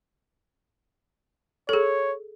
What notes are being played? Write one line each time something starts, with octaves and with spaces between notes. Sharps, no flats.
G#4 A4 C#5